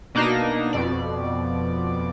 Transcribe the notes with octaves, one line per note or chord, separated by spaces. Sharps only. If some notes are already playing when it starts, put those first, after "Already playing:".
B2 A#3 D4 D#4 A#6
F2 B2 D5